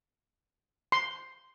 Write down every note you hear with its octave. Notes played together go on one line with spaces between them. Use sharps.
C6